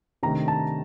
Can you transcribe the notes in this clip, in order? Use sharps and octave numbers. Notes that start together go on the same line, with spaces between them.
C3 D#3 A3 D4 A#5
A5